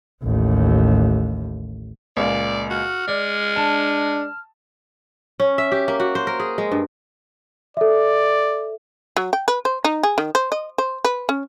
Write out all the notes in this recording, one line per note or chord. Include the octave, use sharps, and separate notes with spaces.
A1 D#2
C#2 A#2 D5
F#4 F6
G#3 D5
D4 A5
C#4
E5
G4
A#3
F#4
C5
A#4
G#4
G#3
G2
A4 D5 E5
F#3
G5
B4
C5
D#4
G#4
D#3
C5
D#5
C5
B4
C#4